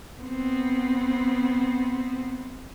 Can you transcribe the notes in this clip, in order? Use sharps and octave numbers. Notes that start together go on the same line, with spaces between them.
B3 C4